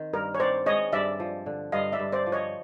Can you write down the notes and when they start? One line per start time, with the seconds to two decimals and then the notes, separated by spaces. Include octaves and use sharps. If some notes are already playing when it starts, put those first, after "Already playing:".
Already playing: D#3 C4
0.13 G2 A#4
0.35 C#5
0.39 C4 C5 D5
0.66 G#3 C#5 D#5
0.93 G2 D5 E5
1.20 F3
1.46 D3
1.72 G2 D#5 F5
1.92 D5 E5
1.99 G2
2.13 C5 D5
2.26 F3
2.32 C#5 D#5